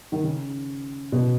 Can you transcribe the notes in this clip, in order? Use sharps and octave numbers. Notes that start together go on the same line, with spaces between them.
D#3
C#3
B2